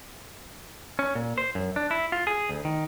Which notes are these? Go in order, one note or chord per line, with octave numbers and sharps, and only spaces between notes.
C#4
A#2
C5
F#2
D4
E4
F4
G#4
D2
D#3